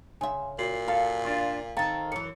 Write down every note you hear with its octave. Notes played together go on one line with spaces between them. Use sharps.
C#3 E5 G#5 C6
A#2 F#4 C7 F#7
A4 F5
D4 F4
D#3 C4 A4 F5 G5 A#5
F#2 E3 C#7